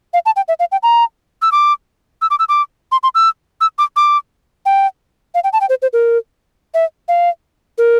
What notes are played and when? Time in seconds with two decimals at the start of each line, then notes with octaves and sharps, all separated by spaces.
0.14 F5
0.26 A5
0.36 G5
0.48 E5
0.59 F5
0.72 G5
0.83 A#5
1.42 E6
1.52 D6
2.22 E6
2.30 D6
2.39 E6
2.49 D6
2.92 C6
3.03 C6
3.15 E6
3.61 E6
3.78 D6
3.96 D6
4.66 G5
5.35 F5
5.44 G5
5.53 A5
5.61 G5
5.69 C5
5.82 C5
5.93 A#4
6.74 E5
7.08 F5
7.78 A#4